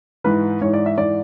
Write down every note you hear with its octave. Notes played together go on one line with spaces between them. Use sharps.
G#2 E3 B4
G#2 E3 C#5
D5
E5
G#2 E3 D5